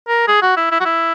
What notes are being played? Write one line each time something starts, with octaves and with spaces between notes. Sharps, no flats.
A#4
G#4
F#4
E4
E4
F#4
E4